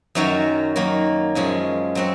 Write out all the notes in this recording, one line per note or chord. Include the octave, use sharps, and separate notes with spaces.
F#2 D#3 F#3 C#4 F#4
D#3 F#3 A#3
F#2 F3 G#3 C#4
F#3 C4 F#4